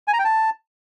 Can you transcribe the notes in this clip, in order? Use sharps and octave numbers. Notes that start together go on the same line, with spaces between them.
G#5
A#5
G5
A5